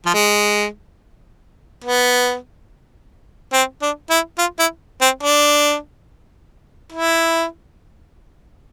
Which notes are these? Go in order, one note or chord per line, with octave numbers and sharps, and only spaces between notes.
F3
G#3
B3
C4
D4
E4
F4
E4
C4
D4
E4